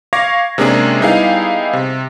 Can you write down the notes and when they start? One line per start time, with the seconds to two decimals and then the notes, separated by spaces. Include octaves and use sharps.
0.13 F5 C#6 D6 G#6 A#6
0.58 C3 G#3 A#3 C#4 D4 G#4
1.01 G3 B3 D#4 E4 G#4 F5
1.73 C3